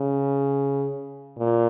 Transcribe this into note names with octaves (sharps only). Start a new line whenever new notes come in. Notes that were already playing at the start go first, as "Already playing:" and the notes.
Already playing: C#3
A#2